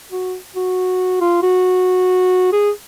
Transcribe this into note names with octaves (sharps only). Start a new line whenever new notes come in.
F#4
F#4
F4
F#4
G#4